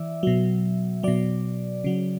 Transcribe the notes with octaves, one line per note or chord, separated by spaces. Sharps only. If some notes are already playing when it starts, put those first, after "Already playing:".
Already playing: E3 D5 E5
B2 F#3
B2 F#3 D5
C#3 F#3